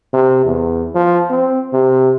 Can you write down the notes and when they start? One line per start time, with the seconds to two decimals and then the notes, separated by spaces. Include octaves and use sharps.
0.13 C3
0.45 E2
0.94 F3
1.30 C4
1.73 C3